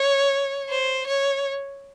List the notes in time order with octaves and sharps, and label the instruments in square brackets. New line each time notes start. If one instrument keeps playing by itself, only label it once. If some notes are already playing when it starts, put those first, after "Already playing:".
Already playing: [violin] C#5
C5
C#5